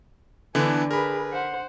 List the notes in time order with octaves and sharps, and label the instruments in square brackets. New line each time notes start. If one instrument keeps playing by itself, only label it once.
[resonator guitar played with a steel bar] D3 [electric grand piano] E3 B3 D4 [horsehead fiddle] B4 G#5
[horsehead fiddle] G#4 B4 [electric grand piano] A#4 B5
[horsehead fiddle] C5 F#5